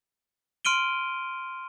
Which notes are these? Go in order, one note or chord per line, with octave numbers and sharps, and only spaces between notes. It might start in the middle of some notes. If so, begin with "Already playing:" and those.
C6 F6 D7 D#7 G7